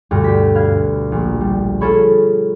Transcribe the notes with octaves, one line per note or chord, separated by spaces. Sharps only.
D2 G2 B2
G4 B6
B4 F5 G#6
A#1
G3
F4 G#4 A4 C#5 B5